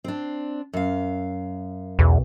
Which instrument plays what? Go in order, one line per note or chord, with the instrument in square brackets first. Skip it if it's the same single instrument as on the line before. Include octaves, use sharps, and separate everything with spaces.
[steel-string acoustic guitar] C4 D4
F#2 F5
[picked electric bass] B1 [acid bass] E2